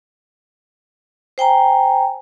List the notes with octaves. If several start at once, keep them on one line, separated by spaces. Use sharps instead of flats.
C5 G5 G#5 A#5